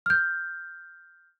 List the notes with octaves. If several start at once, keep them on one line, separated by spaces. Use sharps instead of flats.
F6 G6